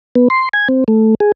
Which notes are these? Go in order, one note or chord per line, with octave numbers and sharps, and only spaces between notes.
B3
C6
G#5
C4
A3
G#4